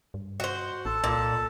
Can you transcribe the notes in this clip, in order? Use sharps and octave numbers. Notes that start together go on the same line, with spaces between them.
G2
F#4 C5
A1 A4 A5
C2 A#2